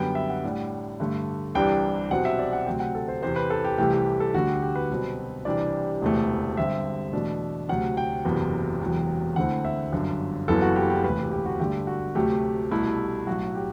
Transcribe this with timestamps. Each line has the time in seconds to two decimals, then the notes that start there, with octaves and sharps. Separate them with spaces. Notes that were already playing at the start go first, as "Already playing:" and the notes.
Already playing: F#2 D3 G3 B3 G5
0.15 E5
0.30 F#5
0.43 A2 G3 D4
1.00 G2 D3 A3
1.55 C2 C3 E3 G3 D4 G5
2.11 C2 B2 F#3 C4 F#5
2.25 E5
2.39 D5
2.53 F#5
2.66 D2 C3 F#3 C4 G5
2.80 F#5
2.95 A4
3.08 C5
3.22 E2 C3 E3 C5
3.36 B4
3.50 A4
3.65 G4
3.78 C2 C3 E3 A3 G4
3.93 G4
4.20 A4
4.34 D2 D3 G3 F#4
4.48 G4
4.62 G4
4.76 B4
4.90 C2 B2 F#3 C4
5.45 C2 C3 E3 G3 D4 D5
6.02 E1 D2 C3 E3 A3
6.57 G2 D3 G3 C4 E5
7.13 E2 B2 A3 D4
7.69 D2 C3 F#3 F#5
7.97 G5
8.25 F#1 E2 C3 F#3 B3
8.81 E1 E2 C3 F#3
9.36 D2 D3 A3 C4 E4 F#5
9.65 E5
9.92 G1 F#2 D3
10.48 F#1 F#2 E3 B3 E4 A4
10.62 F#4
10.76 G4
10.90 G4
11.04 E1 D2 C3 E3 B4
11.18 G4
11.31 G4
11.46 F#4
11.60 G2 D3 A3 D4 G4
11.87 F#4
12.15 D2 C3 F#3 A3 G4
12.71 C2 B2 A3 E4
13.27 B1 A2 F#3 F#4
13.55 G4